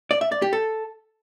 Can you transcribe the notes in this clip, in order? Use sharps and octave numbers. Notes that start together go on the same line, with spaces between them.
D5
E5
D5
G4
A4